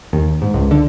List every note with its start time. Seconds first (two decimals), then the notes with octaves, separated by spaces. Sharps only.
0.13 D#2
0.42 G#2
0.54 C#2
0.71 D3